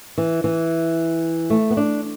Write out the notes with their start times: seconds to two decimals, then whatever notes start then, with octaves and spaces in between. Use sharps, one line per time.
0.18 E3
0.44 E3
1.50 A3
1.70 B3
1.77 D4